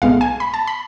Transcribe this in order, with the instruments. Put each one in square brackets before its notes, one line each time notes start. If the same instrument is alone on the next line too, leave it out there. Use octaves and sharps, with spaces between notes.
[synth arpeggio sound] B1 A2 G#3 B3 F5
G#5
B5
A5
B5